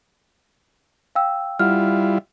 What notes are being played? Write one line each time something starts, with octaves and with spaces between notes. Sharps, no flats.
F5 G5 E6
G3 E4 F4 F#5 F6